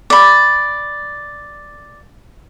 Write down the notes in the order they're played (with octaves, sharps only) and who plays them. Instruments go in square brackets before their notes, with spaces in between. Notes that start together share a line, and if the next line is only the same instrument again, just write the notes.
[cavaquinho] D5 B5